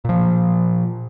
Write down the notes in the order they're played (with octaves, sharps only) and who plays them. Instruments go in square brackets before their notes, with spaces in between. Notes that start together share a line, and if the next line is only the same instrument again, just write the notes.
[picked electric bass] A#2 F3